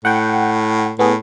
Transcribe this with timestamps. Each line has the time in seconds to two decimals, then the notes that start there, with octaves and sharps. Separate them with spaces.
0.05 A2 F#5 G5
0.99 A2 B3 G#4